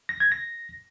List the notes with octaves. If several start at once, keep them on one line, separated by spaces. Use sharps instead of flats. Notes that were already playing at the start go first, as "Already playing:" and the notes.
A#6
G#6
A#6